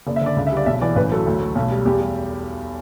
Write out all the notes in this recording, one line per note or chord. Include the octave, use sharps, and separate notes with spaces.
F#1 D5
E5
D3 D5
C#2
E5
G3 D5
B1 E5
E3 D5
A1 B4
F#3 A4
D2
A3
B1
G3
E2 G4
G3